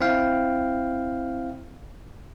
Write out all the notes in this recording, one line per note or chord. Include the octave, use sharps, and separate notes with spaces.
C4 E4 F5 G5